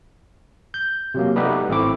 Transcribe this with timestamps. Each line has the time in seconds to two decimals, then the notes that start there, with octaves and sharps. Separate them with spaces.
0.74 G6
1.14 C3 F#3 A#3
1.36 G3 A3 B3 D#4 G4 B4
1.69 G#1 A3 C4 E4 D6